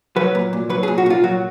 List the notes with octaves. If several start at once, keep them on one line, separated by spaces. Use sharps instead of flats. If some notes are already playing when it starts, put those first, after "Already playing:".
F#3 B4
A#2
A#2
F#3 B4
G#4
A#2
F#4
A#2 F4
F#3 F#4